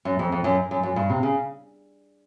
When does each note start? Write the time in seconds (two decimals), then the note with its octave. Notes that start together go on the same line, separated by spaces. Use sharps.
0.05 F#2
0.19 F2
0.32 F2
0.44 F#2
0.71 F#2
0.83 F#2
0.96 G2
1.10 C3
1.23 C#3